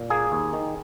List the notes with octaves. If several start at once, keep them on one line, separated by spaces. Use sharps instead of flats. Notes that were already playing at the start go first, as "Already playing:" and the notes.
Already playing: A#2
A#3 G#4
D#2
D#3